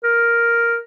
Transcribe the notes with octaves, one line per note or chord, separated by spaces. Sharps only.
A#4